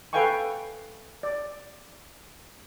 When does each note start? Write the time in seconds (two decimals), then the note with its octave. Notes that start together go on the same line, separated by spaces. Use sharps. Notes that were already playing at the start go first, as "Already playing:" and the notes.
0.13 A4 B4 F5 G5 G#5 C#6
1.23 D5